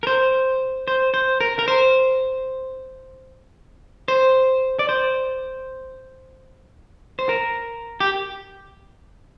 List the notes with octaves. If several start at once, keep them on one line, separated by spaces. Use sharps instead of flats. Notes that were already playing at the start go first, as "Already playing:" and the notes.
A#4
C5
C5
C5
A#4
A#4
C5
C5
D5
C5
C5
A#4
G4